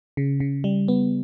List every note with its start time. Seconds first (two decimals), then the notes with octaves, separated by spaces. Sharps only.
0.17 C#3
0.40 C#3
0.64 G3
0.88 B3